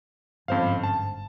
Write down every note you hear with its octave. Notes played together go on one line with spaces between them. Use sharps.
G1 F2 G#2 C#4 C5 F5
A5